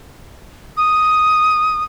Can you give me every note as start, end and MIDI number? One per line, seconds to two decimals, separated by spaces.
0.77 1.84 87